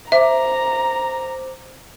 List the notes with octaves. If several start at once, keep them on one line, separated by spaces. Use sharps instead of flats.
C5 E5 A#5 D6